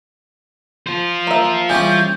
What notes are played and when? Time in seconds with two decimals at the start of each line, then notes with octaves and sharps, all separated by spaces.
0.87 F4 C5
1.27 A#3 E5
1.69 E3 G3 C#4 G4 G#4 G6